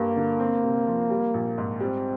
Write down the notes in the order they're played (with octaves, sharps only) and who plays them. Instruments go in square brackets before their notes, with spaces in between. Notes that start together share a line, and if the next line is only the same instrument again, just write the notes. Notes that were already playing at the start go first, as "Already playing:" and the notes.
Already playing: [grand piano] G2 G3 [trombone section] A#3
[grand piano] D3
C4
C3
F3
G3
A#1
G#2
[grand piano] G3 [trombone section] C4